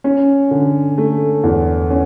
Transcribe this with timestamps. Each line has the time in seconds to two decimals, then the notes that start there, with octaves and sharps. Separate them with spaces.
0.04 C#4
0.51 D3
0.98 A3
1.44 E2
1.90 C#4